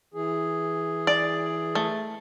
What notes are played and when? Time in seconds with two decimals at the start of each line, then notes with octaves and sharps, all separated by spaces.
0.14 E3 G#4
1.07 D5
1.75 A3